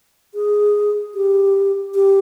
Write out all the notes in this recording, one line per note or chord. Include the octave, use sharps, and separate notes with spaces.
G#4
G4
G4